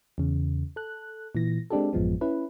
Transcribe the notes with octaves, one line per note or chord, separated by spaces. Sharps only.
E2 C#3
A4 F#6
A#2 E3 A#6
G#3 C4 D4 G4 A4
A1 F#2 F3 G#3 B3
C#4 E4 B4